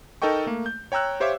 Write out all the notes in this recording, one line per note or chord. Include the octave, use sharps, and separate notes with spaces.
D#4 A4 A#4 D#5 G5 C#6
A3 A#3
G6
C#5 G5 A#5 E6 F#6
G4 C5 C#5 E5 F5 D6